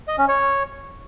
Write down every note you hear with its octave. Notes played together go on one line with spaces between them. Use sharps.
D#5
C#4
C#5